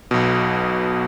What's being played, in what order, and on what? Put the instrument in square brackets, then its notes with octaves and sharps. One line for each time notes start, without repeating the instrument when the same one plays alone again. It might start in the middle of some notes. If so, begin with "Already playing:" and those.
[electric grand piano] B1 B2